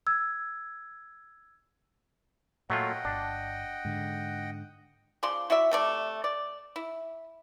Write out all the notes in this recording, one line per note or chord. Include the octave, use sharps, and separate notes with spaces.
E6 G#6
A#2 F#3 A3 F4 D#5 F#5 G5
G1 D4
G#2 D3
C#3 F3 D5 C6
E4 F#4 D5 E5
C3 A3 D5
D5
E4